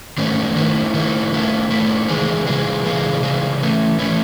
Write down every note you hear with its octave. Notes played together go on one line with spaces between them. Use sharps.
G#2 D#3 A3 C#4
D#3 A3 E4
D#3 A3 E4
D#3 A3 E4
D#3 A3 E4
C#3 E3 G#3 D#4 G#4
C#3 E3 G#3 D#4 G#4
C#3 E3 G#3 D#4 G#4
C#3 E3 G#3 D#4 G#4
E3 A3 C#4
E3 A3 C#4